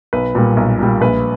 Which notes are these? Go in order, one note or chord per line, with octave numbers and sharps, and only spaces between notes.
B1 B4
A#2 G3
B1
A#2 G3
A#1 B4